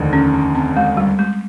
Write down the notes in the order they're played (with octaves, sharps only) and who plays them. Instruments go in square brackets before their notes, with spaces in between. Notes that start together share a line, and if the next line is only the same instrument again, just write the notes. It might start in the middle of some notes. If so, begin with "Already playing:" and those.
Already playing: [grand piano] F1 D#2 D3
[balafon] C#4
C#4
C4
G#3
G3
G#3